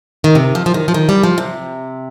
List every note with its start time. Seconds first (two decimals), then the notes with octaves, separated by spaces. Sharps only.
0.24 D#3
0.35 C3
0.55 F3
0.66 F3
0.74 D#3
0.88 F3
0.94 D#3
1.09 G3
1.23 F3
1.38 C3